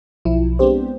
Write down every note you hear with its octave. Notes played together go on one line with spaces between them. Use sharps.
B1 F3 E4
G#3 B3 C4 D4 G4 C5